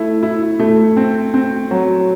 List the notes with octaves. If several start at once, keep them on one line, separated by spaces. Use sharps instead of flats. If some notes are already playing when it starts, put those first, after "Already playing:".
Already playing: A3 E4
E4
A3
C4
C4
F#3